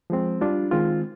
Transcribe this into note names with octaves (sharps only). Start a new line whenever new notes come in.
F3 G#3 C4
G3 D4 F4
D#3 G#3 C4 F4